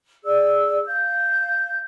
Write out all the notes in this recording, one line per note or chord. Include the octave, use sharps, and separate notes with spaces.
G#4 D5 E6
F5 G6